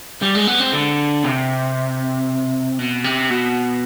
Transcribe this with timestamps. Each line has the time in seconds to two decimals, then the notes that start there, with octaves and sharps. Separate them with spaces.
0.22 G3
0.35 G#3
0.47 B3
0.60 C4
0.73 D3
1.25 C3
2.79 B2
3.04 C3
3.30 B2